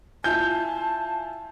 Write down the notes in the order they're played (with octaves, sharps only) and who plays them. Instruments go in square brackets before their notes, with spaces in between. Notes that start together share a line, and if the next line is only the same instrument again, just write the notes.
[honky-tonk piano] E4 F4 G#5 [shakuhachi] A5 [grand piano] G6